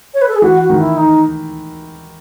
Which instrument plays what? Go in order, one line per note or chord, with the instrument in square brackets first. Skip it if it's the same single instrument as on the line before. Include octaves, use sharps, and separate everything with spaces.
[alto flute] C#5
B4
A4
G#4
[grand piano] E3 [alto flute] F#4
[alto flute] F#4
[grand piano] D#3
[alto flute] E4
D#4